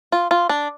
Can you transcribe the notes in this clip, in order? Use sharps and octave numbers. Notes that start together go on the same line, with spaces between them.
F4
F4
D4